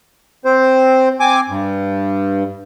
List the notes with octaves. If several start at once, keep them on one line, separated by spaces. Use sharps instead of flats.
C4 C5
C4 G#5 D6
G2